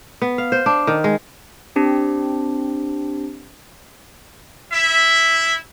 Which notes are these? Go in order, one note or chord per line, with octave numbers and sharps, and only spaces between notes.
B3
F5
C5
D4
D#3
G#3
C4 D4 G4 C5
E4 E5